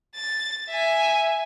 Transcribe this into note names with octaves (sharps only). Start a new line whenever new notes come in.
A6
E5 G#5